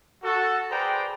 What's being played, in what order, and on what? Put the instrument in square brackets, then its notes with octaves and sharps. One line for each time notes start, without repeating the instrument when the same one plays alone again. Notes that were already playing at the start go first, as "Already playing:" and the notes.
[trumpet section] F#4 A4
G#4 B4 C5 D5 G5 A#5